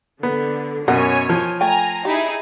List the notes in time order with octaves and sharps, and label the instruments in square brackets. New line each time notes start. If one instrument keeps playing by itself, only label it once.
[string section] D3 [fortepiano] B3
[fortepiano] F#2 B2 [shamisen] A#4 F#5 [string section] C#5 G#5
[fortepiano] F3
[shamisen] A3 G5 [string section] G#5 A#5
[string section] D#4 E4 G#4 [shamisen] G4